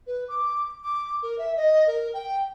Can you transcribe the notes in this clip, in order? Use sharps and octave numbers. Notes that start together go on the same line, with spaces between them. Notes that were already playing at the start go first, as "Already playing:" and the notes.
B4
D6
D6
A#4
E5
D#5
A#4
G5